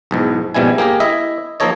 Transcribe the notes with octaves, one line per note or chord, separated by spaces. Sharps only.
B1 E2 G#2
A#1 G#2 B2 G3 E4 G#5
A#3 G4 G#4 A#4
E4 D#5 E5
F3 A#3 D#4 A4 C#5 D#5